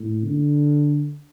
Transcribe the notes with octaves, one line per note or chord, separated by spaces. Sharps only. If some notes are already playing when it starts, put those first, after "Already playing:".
Already playing: A2
D3